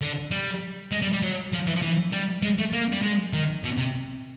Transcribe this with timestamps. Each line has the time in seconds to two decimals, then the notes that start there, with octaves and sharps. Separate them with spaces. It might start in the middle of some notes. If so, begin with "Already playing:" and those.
0.01 D3
0.31 G3
0.92 G#3
1.02 G3
1.13 G3
1.22 F#3
1.52 F3
1.67 E3
1.76 F3
1.82 E3
2.13 G3
2.43 G#3
2.58 A3
2.73 A#3
2.93 G3
3.03 G#3
3.33 D#3
3.64 B2
3.78 C3